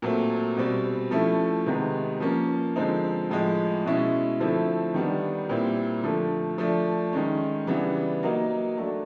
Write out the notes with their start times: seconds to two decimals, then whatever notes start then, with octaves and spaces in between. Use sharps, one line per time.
0.02 A#2 F#3 A3 C4
0.57 B2 G3 C4
1.11 F3 A3 C#4 E4
1.66 C3 D#3 G#3 B3
2.20 F3 A#3 C#4
2.76 D3 F3 G#3 C4 D#4
3.30 A2 F3 G#3
3.85 B2 G#3 C#4 E4
4.40 D3 F3 A3 C4 E4
4.94 D#3 G3 B3 D4
5.49 A#2 G3 C4 E4
6.04 D3 F3 A3
6.58 F3 A3 D4
7.13 D#3 G#3 C#4
7.67 C#3 E3 G3 B3 D4
8.23 F#3 A#3 D#4
8.77 F#3 A3 D4